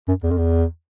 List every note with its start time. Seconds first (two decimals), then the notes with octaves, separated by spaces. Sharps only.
0.08 F#2
0.23 E2
0.31 F2
0.38 E2